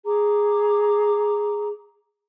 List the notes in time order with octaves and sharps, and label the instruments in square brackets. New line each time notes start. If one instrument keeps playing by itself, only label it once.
[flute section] G#4 A#5 D6